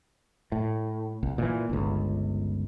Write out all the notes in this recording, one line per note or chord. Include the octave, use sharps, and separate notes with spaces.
A2
C2
A#2 D#3 E3
G1 C#2